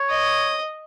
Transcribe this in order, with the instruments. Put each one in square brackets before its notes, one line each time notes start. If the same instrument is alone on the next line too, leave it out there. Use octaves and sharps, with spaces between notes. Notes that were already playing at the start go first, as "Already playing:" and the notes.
Already playing: [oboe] C#5
[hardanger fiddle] D#5